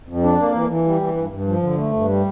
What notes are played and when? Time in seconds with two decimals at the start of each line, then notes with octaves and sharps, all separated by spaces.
0.08 F2
0.23 D4
0.39 A#3
0.55 E3
0.69 E3
0.85 G3
1.01 E3
1.16 G2
1.31 G2
1.47 F3
1.62 D3
1.78 A3
1.93 G2
2.09 G3